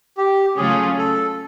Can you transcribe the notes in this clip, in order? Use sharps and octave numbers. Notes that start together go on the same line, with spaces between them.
G4
C#3 F#3 A3 C#4 F4 G#4
A4